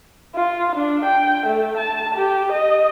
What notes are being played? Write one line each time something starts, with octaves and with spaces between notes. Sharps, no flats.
F4
D4
G5
A3
A5
G4
D#5